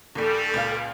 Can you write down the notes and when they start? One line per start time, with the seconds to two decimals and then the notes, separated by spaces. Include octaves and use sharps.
0.15 A#1 D#2 G3 A4
0.54 C#2 A#2 F5